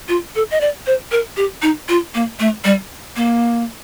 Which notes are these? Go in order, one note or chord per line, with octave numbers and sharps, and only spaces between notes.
F4
A4
D#5
D5
C5
A#4
G4
D#4
F4
A#3
A3
G3
A#3